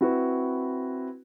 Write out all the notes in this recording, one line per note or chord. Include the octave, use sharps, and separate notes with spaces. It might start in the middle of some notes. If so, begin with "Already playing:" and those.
C4 E4 F#4 B4